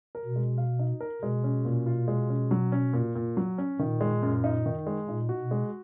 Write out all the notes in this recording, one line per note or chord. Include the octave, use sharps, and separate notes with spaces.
A#4
B2
G#3
F5
D#4
A#4
B2 G#3
C#4
A#2
F4
G#3
C#4
F#3
C#4
A#2
A#2
F#3
C#4
A#2 D#3
G#3
F#2
D#4
D#3
G#3
A#2 D#4
F#4
B2
G#3